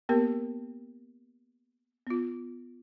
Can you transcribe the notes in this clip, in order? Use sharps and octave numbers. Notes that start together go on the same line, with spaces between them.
A#3 B3 G4 A#4
B3 F4